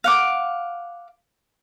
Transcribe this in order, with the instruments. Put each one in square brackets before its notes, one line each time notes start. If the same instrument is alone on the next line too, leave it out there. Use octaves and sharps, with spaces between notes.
[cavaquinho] F5 F#5 D6